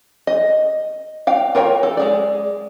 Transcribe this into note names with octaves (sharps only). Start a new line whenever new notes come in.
D#5
F5 G5
F4 A#4 C#5 G5
A4
G#3 G#4 D5